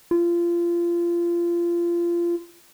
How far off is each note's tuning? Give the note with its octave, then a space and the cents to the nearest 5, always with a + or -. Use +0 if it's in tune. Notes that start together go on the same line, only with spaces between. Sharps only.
F4 -25